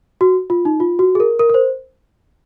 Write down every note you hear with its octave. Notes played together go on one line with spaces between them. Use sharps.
F#4
F4
D#4
F4
F#4
G#4
A#4
A#4
A#4
C5